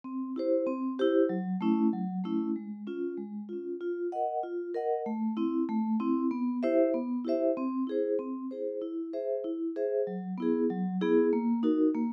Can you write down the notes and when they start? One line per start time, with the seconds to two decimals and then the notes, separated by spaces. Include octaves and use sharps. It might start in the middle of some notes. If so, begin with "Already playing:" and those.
0.04 C4
0.36 E4 G4 C5
0.67 C4
0.99 E4 G4 C5
1.29 F#3
1.61 A3 C#4 E4
1.93 F#3
2.24 A3 C#4 E4
2.56 G#3
2.87 C#4 F4
3.17 G#3
3.49 C#4 F4
3.81 F4
4.12 A#4 D#5 F#5
4.43 F4
4.74 A#4 D#5 F#5
5.06 A3
5.37 C4 E4
5.69 A3
6.00 C4 E4
6.31 B3
6.63 E4 G4 C5 E5
6.94 B3
7.25 E4 G4 C5 E5
7.57 C4
7.87 E4 G#4 C5
8.19 C4
8.51 E4 G#4 C5
8.82 E4
9.13 G#4 C5 E5
9.44 E4
9.76 G#4 C5 E5
10.07 F#3
10.38 B3 E4 G#4
10.70 F#3
11.01 B3 E4 G#4
11.33 A#3
11.63 D#4 F#4 A#4
11.95 A#3